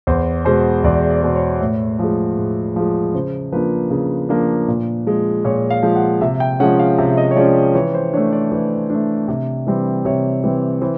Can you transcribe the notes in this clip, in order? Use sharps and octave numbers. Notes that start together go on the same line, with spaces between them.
E2 C5
B2 G#3 C5
E2 D5
D5
B2 G#3
C#5
A2 C#5
F3 G#3
A2
F3 G#3
C#3 C5
F3 A#3 D4 B4
C#3
F3 A#3 D4
A#2
F3 G#3
A#2 C#5
F5
F3 G#3
F#5
C3 E5
G5
F3 G#3 C#4 F#5
F5
C3 E5
D#5
C#5
F3 G#3 C#4 D5
E3 C#5
C5
A3 D4 C#5
D5
E3
A3 D4
C3
E3 G3 C4
C3 C#5
E3 G3 C4
E3 C5